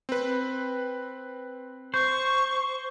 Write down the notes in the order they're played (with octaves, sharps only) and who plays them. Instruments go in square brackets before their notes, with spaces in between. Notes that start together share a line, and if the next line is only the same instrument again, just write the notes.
[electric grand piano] C4 B4
[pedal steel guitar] C5 [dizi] C#6